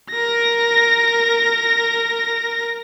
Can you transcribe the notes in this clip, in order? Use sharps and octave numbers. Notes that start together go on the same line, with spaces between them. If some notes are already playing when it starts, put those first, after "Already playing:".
A#4 A#6